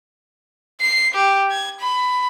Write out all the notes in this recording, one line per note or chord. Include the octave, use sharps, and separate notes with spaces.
C7
G4
G#6
B5